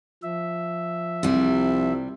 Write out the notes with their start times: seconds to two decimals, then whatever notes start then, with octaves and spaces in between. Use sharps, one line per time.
0.23 F3 E5
1.23 C2 C3 G3